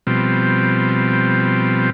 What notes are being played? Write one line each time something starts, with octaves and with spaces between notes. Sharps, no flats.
B2 F3 G3 C4